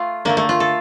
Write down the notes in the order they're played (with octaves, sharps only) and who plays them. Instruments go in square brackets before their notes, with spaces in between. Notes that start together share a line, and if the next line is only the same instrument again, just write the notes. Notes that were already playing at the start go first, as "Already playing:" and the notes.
Already playing: [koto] A3 F4
D3 A3 A#3
A3
F4
A4